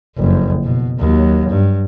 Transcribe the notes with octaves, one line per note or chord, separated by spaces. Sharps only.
F#1 F2
B2
D#2 F#3
G2